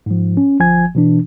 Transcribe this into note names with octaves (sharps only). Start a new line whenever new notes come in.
G#2 F3
C#4
G1 F3 G#5 G#6
B2 E3 D4